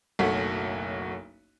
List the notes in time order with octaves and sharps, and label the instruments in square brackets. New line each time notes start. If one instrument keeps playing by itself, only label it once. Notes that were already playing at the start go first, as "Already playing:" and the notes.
[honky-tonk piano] F#1 B1 A3 F#4 C#5 B6